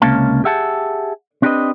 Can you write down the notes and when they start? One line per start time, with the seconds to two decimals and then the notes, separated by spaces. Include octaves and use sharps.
0.02 C#2 C3 A#3 C#4 F5 A5
0.44 G4 G#4 E5 F#5 G5 A5
1.42 C4 D4 G4 A4 B4 D#5